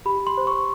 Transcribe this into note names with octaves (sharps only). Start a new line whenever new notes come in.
G4 B5
C6
C5
C#6